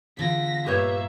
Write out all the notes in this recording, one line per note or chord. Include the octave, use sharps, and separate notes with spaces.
E2 D3 F4 A#6 B6
G2 A#2 A#3 F4 G4 B4 C#5 E5